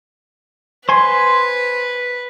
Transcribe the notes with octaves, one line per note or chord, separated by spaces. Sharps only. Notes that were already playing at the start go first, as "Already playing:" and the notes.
B4 C5 G#5 C6